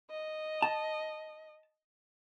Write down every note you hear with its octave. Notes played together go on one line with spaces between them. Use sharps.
D#5
A5